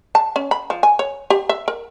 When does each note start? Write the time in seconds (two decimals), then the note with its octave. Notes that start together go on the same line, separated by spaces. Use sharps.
0.15 A5
0.36 C#4
0.51 B5
0.70 F3
0.83 G#5
0.99 C#5
1.30 G4
1.49 E5
1.68 A#4